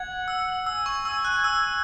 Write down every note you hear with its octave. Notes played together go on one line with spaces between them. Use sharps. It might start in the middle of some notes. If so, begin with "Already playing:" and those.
Already playing: F#5 G#6
E6
G#5 E6
C#6
E6
F#6
E6